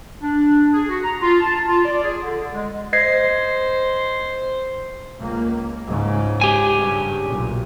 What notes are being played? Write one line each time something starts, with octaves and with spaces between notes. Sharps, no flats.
D4
G#4
F#4
A#5
F4
A5
F4
D5
G#4
D3
G#3
C5 D#5 G#6 C7
C#2 A#3
C#2 G#2 C#3
G4 G#5
G2 C#3
B1 A#2